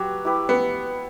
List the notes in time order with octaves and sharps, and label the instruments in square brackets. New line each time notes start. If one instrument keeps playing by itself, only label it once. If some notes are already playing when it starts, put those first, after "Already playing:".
Already playing: [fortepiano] F#3 [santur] G4 B4
[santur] E4 G4 B4
[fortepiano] B3